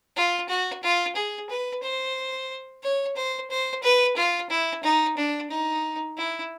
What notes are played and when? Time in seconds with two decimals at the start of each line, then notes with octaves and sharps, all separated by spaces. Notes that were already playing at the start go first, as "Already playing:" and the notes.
0.16 F4
0.49 F#4
0.83 F4
1.15 G#4
1.50 B4
1.83 C5
2.83 C#5
3.16 C5
3.50 C5
3.83 B4
4.16 F4
4.50 E4
4.83 D#4
5.17 D4
5.50 D#4
6.17 E4